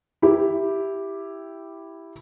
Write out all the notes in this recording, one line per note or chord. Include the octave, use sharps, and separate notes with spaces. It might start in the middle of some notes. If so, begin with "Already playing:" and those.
E4 G4